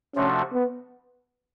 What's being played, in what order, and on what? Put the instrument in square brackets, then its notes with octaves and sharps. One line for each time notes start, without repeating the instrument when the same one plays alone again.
[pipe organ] C3 F3 A3 D4 F#4 [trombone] C#4
[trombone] B3